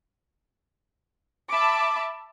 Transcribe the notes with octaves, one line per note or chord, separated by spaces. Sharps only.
E5 A5 B5 D6